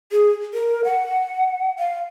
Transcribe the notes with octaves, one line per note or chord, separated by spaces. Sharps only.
G#4
A#4
F#5
F5